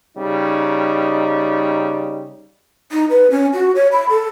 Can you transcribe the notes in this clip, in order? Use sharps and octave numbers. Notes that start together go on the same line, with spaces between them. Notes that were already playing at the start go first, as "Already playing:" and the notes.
C#3 G3 D#4
D#4
B4
C#4
F#4
C#5
B5
A4